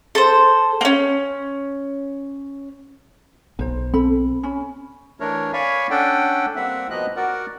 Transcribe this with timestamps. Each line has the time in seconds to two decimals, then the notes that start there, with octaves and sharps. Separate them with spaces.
0.15 A4 C5
0.81 A#3 C#4
3.59 B1 B2 C5 A#5
3.94 C4 A4 B5
4.43 C#4 B5
5.20 E3 A3 D4 A#4 C#5
5.53 C#5 D5 F5 G#5 B5 C#6
5.90 C#4 D4 A4 D5 F#5 G5
6.56 G3 A#3 C4 E5 F#5
6.90 B2 F3 A#3 B3 D#5 F#6
7.16 F#4 A#4 D5 F#5